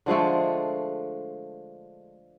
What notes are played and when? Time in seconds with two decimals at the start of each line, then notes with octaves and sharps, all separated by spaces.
0.06 D3 F3 G#3 A3